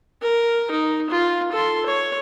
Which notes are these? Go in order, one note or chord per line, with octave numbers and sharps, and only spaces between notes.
A#4
D#4
F4
A4 C6
C#5